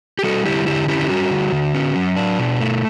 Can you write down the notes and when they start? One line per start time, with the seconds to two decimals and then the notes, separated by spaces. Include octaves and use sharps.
0.19 G4
0.24 G3 F#4 A4
0.45 D3 E4 G4
0.66 D3 E4 G4
0.88 C#4 E4 G4
1.09 G3 F#4
1.31 D3
1.52 D3
1.74 C#4
1.96 F#3
2.17 D4
2.39 B2
2.61 A3